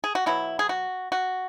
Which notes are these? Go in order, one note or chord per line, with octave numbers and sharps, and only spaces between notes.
G#4
F#4
B2 F#3 B3 E4
G#4
F#4
F#4